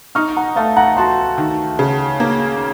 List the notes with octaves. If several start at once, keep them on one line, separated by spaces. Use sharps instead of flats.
D#4 C#6 F6
F#5 A#5
A3 F5 A5
F#5 A#5
F#4 A5 C6
D#3
C#3
A#3